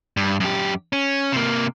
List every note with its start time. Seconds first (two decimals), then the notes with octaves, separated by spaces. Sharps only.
0.17 G2
0.40 F#2 G4
0.93 C#4
1.32 C3 A#3